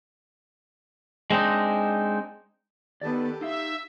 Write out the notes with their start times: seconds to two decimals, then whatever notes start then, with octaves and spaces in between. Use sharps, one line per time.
1.30 G#3 C4 D4 D#4
3.01 D#3 B3 G4 A4 B4 D5
3.41 D#4 E5 F5 E6